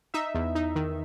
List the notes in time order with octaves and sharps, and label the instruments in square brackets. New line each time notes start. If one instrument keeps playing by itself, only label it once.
[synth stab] D#4 E5
E2
D#4
D#3